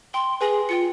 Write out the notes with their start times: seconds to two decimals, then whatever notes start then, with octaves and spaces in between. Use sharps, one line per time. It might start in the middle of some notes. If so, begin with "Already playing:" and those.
0.14 G5 C6
0.41 G#4 B4 G#5 A#6
0.69 F4 G5 C#7